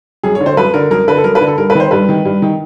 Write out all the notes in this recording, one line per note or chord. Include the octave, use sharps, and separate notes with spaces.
F#2 G#4
C#5
D3
C5
F#2 B4
D3 A#4
F#2 A#4
D3 B4
A4
F#2 A#4
B4
D3
A4
G2 A#4
B4
D#3 C5
G2 B4
D#3
G2
D#3